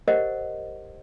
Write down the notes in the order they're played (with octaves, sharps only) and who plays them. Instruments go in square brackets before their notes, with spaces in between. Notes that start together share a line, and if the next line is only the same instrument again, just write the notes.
[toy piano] G4 A#4 C5 D#5 F#5